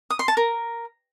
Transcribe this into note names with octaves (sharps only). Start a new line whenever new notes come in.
D#6
C6
A5
A#4